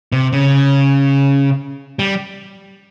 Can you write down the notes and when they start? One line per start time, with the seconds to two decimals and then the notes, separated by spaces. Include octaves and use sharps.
0.12 C3
0.33 C#3
1.99 G3